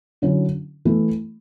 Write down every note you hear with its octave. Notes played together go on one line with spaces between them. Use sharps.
D3 F#3 C#4 E4
E3 A3 E4